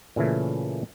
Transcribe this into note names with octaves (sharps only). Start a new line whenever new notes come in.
A#2 C#3 E3 A3